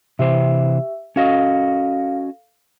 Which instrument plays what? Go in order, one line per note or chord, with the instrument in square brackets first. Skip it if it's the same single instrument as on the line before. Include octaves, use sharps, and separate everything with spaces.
[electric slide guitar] C3 E3 C5 [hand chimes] G4 E5
[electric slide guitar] C#4 F#4 D#5 [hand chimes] A4 F5 A#6